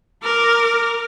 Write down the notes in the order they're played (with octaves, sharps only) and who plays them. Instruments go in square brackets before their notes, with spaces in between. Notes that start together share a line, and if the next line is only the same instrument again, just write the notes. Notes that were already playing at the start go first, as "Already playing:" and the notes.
[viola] A#4 D6